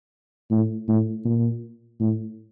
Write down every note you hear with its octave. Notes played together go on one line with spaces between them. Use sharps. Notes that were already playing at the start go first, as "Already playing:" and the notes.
A2
A2
A#2
A2